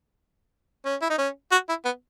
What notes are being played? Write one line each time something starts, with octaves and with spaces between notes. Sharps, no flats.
C#4
E4
D#4
C#4
F#4
E4
B3